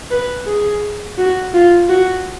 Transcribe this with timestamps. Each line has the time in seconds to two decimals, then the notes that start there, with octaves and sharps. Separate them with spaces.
0.11 B4
0.46 G#4
1.18 F#4
1.54 F4
1.89 F#4